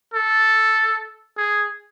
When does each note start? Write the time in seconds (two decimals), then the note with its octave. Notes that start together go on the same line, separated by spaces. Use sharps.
0.14 A4
1.37 G#4